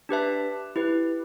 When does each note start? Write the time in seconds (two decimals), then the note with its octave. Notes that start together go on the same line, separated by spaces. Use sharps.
0.09 D4 G4 B4 E5 A5
0.76 E4 G4 B4